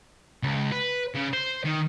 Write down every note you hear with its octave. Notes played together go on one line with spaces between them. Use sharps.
C#2
B4
C#3
C5
D#3